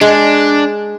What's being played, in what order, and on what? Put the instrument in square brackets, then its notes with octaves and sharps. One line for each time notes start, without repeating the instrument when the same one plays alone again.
[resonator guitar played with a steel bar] G#3 [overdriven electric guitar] D4